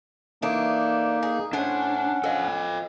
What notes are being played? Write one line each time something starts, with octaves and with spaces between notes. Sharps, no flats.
E3 A3 A#3 D4 D#4
G#4
A2 C#4 D4 C5 F#5 G#5
F3 A4 D#5